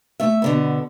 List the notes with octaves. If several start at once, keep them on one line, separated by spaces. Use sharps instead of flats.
A3 E5
B2 D3 B3